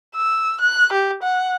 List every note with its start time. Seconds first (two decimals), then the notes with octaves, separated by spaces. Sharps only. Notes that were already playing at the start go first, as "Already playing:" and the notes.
0.16 E6
0.61 F#6
0.93 G4
1.23 F#5